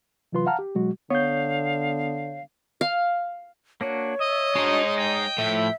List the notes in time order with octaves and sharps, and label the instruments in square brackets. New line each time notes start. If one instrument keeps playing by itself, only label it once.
[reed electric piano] C3 E3 F#3 F4 B4 C6
F5 F#5 A5 A#5 F6
G4
B2 F#3 G#3 F#4
[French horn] D3 [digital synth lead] B3 [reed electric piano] C#5 G6 [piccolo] F5
[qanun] F5
[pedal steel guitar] A#3 D4 F#4 [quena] C#5
[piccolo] D#5 [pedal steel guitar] E5
[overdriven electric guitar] G#3 D#4 [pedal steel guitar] D4 F#4 C6
[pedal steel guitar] D#5 [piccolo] G5
[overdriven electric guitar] A2 [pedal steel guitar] F3 A3 [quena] E5